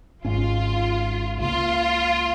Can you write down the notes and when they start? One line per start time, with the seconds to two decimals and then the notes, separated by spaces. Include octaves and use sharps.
0.25 G#1 G#2 G#3 C#4 F4
1.40 C#2 C#3 A#3 F4